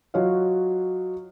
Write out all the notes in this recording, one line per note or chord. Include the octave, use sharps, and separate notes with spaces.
F#3 F4 F#4 C#5 D#5 F5